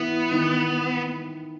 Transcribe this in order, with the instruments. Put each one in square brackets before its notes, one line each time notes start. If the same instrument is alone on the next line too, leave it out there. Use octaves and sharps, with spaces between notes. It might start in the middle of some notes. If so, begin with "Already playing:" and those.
Already playing: [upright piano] E3 E4 [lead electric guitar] B3
[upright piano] D#3 D#4